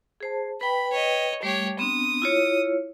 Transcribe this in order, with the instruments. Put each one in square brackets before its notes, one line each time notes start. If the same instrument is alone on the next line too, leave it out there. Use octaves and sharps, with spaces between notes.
[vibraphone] G#4 C5 A5
[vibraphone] B4 G5 [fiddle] B5
[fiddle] C#5 D#5
[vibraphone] G3 A3 [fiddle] G4 C#5
[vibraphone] B3 C4 D4 [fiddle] D#6
[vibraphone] E4 F4 C#5